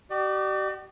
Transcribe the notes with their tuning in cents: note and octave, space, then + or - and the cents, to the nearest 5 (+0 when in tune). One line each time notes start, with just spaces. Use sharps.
G4 -40 D5 +40